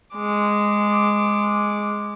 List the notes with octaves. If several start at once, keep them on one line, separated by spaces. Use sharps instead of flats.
G#3 D6